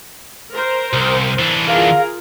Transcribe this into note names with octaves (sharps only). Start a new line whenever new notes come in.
A#4 C5
C2
E3 D4
F4 G#4 A#4 F5